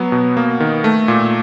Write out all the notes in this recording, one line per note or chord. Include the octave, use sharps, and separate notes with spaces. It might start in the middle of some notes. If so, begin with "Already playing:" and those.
Already playing: F#3 B3
B2
A#3
D#3
A3
A#2